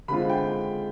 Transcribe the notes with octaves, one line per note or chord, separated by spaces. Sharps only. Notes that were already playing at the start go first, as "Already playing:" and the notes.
D3 G#3 C4 F4 B5
G5